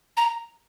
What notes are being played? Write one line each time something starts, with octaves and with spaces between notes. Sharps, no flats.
A#5